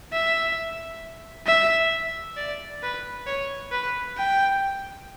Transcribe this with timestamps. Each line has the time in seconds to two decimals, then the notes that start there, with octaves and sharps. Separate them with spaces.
0.13 E5
1.47 E5
2.37 D5
2.83 B4
3.27 C#5
3.72 B4
4.17 G5